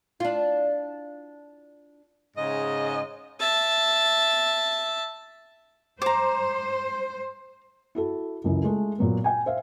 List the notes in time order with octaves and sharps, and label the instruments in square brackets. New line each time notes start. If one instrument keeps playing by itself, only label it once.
[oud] D4 F4
[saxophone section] G#2 C#3 D#5
[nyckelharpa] E5 A5
[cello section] C5 [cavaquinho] A#5 D6
[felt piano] E4 F#4 A4
C#2 F#2 E3
G#3 A3 A4
A#2 F#3 B3
G5 G#5
C5 E5 F5